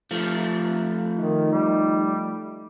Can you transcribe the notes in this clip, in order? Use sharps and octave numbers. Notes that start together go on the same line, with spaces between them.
F3 A3
D#3 D#4
G3